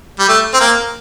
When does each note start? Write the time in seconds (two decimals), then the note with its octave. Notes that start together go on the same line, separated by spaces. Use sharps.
0.19 G3
0.29 A3
0.54 C4
0.60 A#3